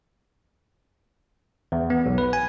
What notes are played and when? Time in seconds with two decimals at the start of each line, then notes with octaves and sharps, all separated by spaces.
1.72 E2
1.90 B3
2.06 B1
2.18 B4
2.33 G#5